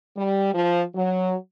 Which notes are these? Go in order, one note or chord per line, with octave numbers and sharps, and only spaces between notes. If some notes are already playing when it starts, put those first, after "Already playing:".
G3
F3
F#3